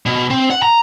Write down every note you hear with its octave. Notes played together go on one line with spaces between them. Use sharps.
B2
C4
F#5
A#5